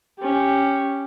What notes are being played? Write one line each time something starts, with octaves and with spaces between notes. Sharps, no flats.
C#4 G4